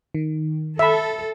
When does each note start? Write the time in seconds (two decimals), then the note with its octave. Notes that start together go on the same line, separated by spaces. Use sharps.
0.15 D#3
0.79 A4 E5 B5